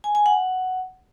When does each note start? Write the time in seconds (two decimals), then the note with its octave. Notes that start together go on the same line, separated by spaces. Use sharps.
0.04 G#5
0.15 G#5
0.26 F#5